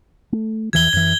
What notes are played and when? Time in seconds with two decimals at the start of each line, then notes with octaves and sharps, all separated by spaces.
0.32 A3
0.73 E2 E3 F3 G#6 G7
0.93 F#2 E3 G#6